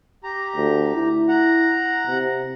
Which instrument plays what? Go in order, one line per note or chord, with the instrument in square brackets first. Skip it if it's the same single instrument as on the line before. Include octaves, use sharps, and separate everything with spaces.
[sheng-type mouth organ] G4 A#5
[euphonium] D2
E4
[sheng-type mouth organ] F#5 A#5
[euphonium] C3